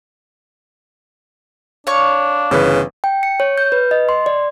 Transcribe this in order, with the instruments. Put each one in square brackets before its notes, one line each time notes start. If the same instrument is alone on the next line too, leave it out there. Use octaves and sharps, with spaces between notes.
[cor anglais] D4 [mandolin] C#5 F5 C#6
[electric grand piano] G1 E3 B4 [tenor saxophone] C#3
[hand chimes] G5
C#7
C#5
G6
B4
D#5
C6
D5